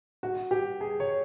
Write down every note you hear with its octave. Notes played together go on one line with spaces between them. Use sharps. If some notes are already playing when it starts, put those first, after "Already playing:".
F#4
G4
G#4
C#5